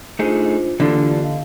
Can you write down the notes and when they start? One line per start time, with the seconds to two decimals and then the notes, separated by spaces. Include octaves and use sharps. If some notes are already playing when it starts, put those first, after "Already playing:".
0.19 A3 D4 D#4 F4 G#4 C5
0.80 D3 E3 A#3 D4 F4 G4
1.22 D#5 F5